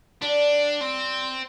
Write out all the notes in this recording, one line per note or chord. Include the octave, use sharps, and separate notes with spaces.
G3 D4
C4